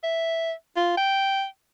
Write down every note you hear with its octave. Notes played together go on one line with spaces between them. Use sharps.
E5
F4
G5